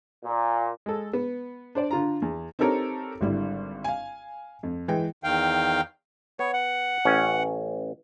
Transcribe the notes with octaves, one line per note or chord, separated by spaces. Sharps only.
A#2
G#3 A4
B3
D4 C5 D5
D3 F4 A#5
E2
C4 D#4 G4 A4 A#4 C#5
G#1 D3 G3 E4
F5 G#5
F2
E3 G#3 G5
E2 D#3 F5 G5
B3 C#5
F#5
A1 C#4